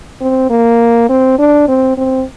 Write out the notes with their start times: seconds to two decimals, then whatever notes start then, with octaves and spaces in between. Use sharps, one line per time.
0.21 C4
0.50 A#3
1.09 C4
1.39 D4
1.68 C4
1.98 C4